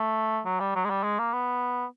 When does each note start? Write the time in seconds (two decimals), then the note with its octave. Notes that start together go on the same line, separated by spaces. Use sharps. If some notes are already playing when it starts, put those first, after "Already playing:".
Already playing: A3
0.45 F#3
0.60 G3
0.75 F#3
0.85 G#3
0.90 G3
1.03 G#3
1.19 A#3
1.33 B3